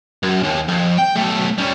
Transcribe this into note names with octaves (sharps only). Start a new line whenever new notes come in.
F#2
D#2
F2
G5
B1 A3
G3 C#4